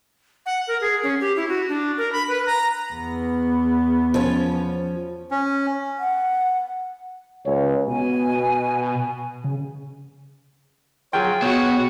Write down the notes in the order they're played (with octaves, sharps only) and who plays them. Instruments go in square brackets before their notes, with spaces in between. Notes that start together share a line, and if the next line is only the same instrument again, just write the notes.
[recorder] F#5
A#4
G#4
C#4
G4
E4
F#4
D4
A#4
B5
B4
A#5
[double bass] E2 B3
[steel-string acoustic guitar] F3 C#4
[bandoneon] C#4
[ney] F#5
[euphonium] C#2 [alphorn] C#5
[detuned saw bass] B2 [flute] G#5
[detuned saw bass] C#3
[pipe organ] F#3 F4 [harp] G#4 G5
[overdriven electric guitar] B2 [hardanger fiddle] F#4 [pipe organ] C#5